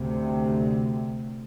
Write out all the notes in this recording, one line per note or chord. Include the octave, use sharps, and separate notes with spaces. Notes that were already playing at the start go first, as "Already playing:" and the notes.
Already playing: D2 C3